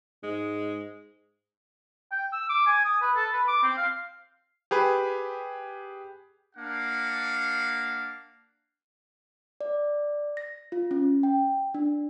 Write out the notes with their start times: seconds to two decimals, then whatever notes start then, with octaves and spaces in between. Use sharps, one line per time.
0.24 G#2 G#3
2.11 G5
2.33 E6
2.49 D6
2.66 G#5
2.85 D#6
3.01 B4
3.16 A4
3.33 B4
3.48 D6
3.63 C4
3.77 F5
4.71 G4 G#4 B4
6.56 A#3 D4 F5 F#5
9.61 D5
10.37 A#6
10.72 F4
10.91 C#4
11.23 G5
11.74 D4